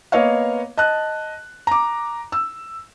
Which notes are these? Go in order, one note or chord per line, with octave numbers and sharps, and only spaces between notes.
A#3 B3 C#5 D#5 F5
D#5 A5 F#6
A#5 D6
E6